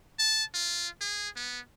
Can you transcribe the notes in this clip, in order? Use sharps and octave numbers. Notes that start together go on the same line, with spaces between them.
A5
F4
G#4
B3